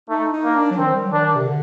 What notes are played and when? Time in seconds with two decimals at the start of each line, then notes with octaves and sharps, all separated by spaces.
0.09 A3 D#4
0.33 D#4
0.44 A#3
0.55 D4
0.71 F#3
0.78 D#3 C4
0.94 G3
1.04 F#3
1.12 D#3 D4
1.35 C3
1.47 D3